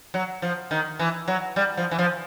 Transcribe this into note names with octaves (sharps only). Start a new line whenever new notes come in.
F#3
F3
D#3
E3
F#3
G3
F3
E3
F3